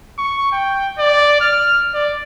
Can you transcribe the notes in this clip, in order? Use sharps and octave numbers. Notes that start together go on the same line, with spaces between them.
C#6
G5
D5
F6
D5